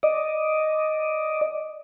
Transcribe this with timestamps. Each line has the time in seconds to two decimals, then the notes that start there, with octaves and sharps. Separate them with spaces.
0.03 D5 D#5